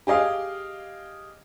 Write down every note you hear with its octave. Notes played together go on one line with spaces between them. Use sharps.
G4 G#4 D#5 F5